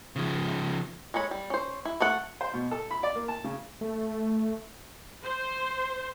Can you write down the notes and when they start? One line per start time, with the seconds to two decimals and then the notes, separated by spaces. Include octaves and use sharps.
0.16 C#3 F3
1.14 G#3 A4 C#5 B5
1.31 G3
1.50 C#4 C5
1.85 E4
2.00 A3 A4 F#5
2.41 C5
2.54 B2
2.71 A4
2.91 B5
3.03 D5
3.16 A#3
3.28 A5
3.44 C#3
3.81 A3
5.23 C5